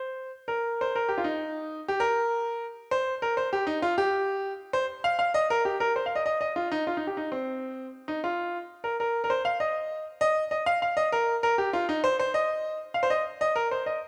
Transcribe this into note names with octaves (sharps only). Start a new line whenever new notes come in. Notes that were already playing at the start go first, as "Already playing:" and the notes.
Already playing: C5
A#4
C5
A#4
G4
F4
D#4
G4
A#4
C5
A#4
C5
G4
D#4
F4
G4
C5
F5
F5
D#5
A#4
G4
A#4
C5
F5
D#5
D#5
D#5
F4
D#4
F4
D#4
G4
D#4
C4
D#4
F4
A#4
A#4
A#4
C5
F5
D#5
D#5
D#5
F5
F5
D#5
A#4
A#4
G4
F4
D#4
C5
C5
D#5
F5
C5
D#5
D#5
A#4
C5
D#5